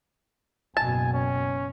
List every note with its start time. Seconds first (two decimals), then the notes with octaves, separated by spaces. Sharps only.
0.77 F#1 B2 G#5 A5
1.14 C#4